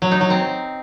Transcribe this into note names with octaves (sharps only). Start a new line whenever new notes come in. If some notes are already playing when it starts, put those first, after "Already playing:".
F#3
D#4
F#3
C4